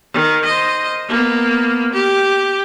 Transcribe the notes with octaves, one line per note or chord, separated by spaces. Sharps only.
D#3
C5 D#5
A#3 B3
G4